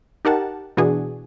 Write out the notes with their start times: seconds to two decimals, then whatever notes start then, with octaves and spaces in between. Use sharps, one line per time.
0.25 D#4 G4 A#4 F#5 A5
0.77 B2 E3 D4 F#4 G#4